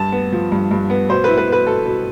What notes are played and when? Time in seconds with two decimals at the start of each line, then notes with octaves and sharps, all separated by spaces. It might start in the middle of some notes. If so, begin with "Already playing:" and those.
Already playing: G2 A5
0.12 B3
0.33 F3
0.52 G2
0.71 G2
0.90 B3
1.09 B2 C5
1.24 E4 B4
1.38 B4
1.48 B3 B4
1.67 B2 A4
1.86 B2